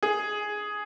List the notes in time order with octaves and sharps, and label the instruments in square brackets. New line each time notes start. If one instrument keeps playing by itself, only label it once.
[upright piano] G#4